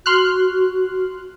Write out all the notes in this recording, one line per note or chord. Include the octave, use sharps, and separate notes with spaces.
F#4 C6 F6 F#6